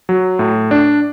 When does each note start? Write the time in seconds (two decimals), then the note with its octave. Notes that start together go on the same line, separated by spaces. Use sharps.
0.09 F#3
0.39 A2
0.71 D4